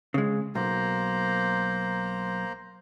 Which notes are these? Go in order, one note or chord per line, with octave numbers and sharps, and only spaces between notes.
C#3 G#3
B1 A#3 C5 A#5